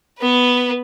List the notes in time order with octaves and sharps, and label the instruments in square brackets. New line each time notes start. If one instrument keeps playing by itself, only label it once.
[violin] B3 B4